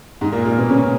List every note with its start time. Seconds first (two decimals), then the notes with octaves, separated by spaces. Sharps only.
0.21 G#2 G#3
0.32 A#2 A#3
0.45 A#2 A#3
0.58 B2 B3
0.69 C#3 C#4